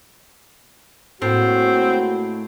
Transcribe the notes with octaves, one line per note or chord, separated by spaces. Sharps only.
A2 G#3 A#3 C4 F#4